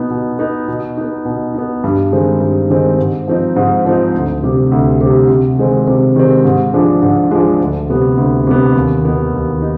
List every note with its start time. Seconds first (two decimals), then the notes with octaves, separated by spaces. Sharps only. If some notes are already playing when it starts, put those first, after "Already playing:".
Already playing: B2 B3 D#4
0.10 B2
0.39 B3 D#4
0.68 B2
0.97 B3 D#4
1.25 B2
1.54 B3 D#4
1.84 G2
2.12 D#3 G#3 C4 D#4
2.41 G2
2.70 D#3 G#3 C4 D#4
2.99 G#2
3.28 F3 C4 D#4
3.56 G#2
3.85 F3 C4 D#4
4.14 D2
4.43 C3 G3
4.72 D2
5.01 C3 G3
5.29 C3
5.58 D#3 G#3 C4
5.87 C3
6.16 D#3 G#3 C4
6.45 G#2
6.74 F3 G#3 D4
7.02 G#2
7.31 F3 G#3 D4
7.60 D2
7.89 C3 G3 B3
8.17 D2
8.47 C3 G3 B3
8.75 D#2
9.04 D#3 B3 D#4
9.33 D#2
9.62 D#4